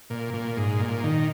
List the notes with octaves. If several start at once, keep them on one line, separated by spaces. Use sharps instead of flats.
A#2
A#2
G#2
A#2
D#3